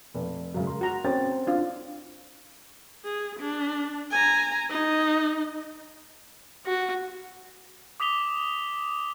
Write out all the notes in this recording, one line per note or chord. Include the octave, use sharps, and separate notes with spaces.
F1
F#2 C#3 G#3
A#4 C6
F#4 A#5
C4 C#4 G5 A6
D4 F4
G#4
D4
G#5 A#5
D#4
F#4
D6 D#6 B6 F7 G7